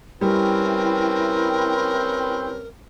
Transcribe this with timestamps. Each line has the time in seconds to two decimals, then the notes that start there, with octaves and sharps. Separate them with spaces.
0.21 G3 C4 C#4 E4 A#4 B4 G5